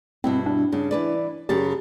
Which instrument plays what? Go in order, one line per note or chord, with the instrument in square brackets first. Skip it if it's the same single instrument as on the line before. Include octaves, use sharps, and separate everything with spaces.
[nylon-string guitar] G2 B2 E4 [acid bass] C4
[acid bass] D4
[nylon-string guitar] G2 C#3
E3 B4 D5
[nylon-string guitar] F#2 C#3 A5 [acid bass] G4